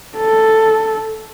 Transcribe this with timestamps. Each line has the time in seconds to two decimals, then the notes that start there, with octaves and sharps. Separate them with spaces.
0.17 A4